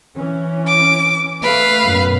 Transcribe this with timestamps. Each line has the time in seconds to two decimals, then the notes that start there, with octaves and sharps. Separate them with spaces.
0.16 E3 C#4
0.67 D6
1.43 A3 B4 F5
1.84 F#2 B2